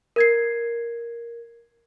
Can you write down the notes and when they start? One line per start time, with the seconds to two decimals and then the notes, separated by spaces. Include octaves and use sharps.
0.16 A#4 G#6 C7